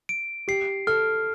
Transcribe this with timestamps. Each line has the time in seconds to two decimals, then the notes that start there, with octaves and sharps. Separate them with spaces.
0.09 D7
0.48 G4 C7
0.87 A4 F6